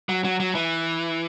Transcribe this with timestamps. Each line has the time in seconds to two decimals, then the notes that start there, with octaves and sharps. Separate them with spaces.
0.09 F#3
0.24 F#3
0.40 F#3
0.55 E3